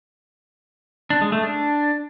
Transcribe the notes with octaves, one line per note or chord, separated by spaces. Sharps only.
D4
G#3
A3
D4